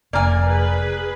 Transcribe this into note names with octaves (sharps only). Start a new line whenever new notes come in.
F1 A#3 D5 G#5 A#5 F6
G#4 B4